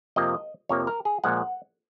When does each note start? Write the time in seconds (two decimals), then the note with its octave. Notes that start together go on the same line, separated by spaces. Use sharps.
0.16 F2 C3 F3 A#3 D#5
0.69 F2 C3 F3 A#3 C#5
0.87 A#4
1.05 G#4
1.24 A#2 F3 G#3 F#5